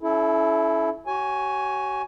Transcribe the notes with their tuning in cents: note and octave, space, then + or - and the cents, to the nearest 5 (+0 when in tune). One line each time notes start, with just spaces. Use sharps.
C#4 +35 E4 +0 A4 -30
F#4 +45 C#5 +0 G#5 +5